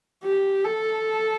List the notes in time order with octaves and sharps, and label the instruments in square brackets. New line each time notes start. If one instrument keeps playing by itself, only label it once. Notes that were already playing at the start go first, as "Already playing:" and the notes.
[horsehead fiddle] G4
A4